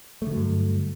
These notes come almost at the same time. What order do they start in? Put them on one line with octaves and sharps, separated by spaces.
A3 D3 F#3 G2